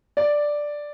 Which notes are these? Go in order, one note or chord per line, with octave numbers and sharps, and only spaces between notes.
D5